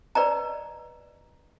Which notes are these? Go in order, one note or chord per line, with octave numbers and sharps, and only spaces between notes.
B4 D5 D#5 A#5